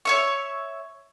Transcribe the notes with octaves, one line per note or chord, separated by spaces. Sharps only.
C#5 E5 C#6